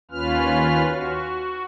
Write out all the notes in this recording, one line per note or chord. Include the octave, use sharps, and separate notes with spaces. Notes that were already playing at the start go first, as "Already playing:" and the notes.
D#2 C#4 F4 B4 F6
F#4